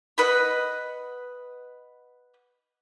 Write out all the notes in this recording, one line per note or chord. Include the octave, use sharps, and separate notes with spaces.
B4 D#5 F#5 B5